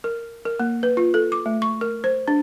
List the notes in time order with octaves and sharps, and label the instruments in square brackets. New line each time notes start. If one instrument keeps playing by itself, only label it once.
[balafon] A#4
A#4
A#3
B4
F4
A4
D6
A3
C#6
A#4
C5
D4